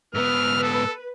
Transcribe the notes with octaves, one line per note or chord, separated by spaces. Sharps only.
G#2 B3 B4 E6 F6
A4